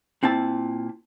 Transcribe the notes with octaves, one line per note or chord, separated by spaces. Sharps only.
A#2 C4 E4 A5